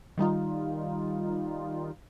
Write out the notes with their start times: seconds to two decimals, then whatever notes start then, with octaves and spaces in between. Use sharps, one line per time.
0.18 D#3 G3 D#4 F4